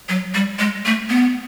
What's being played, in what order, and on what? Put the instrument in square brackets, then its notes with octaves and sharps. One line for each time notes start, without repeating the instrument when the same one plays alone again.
[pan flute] F#3
G3
G#3
A3
B3